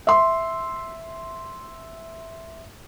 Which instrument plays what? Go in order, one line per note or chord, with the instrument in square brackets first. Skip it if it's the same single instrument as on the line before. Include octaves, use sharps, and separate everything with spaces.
[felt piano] E5 C6